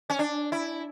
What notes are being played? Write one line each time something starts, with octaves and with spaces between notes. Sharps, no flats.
C#4
D4
E4